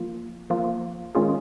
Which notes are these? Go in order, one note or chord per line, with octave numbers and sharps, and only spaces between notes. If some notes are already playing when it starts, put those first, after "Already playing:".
Already playing: F3 A#3 F4
F3 A#3 F4
D#3 G#3 C#4 F4 G#4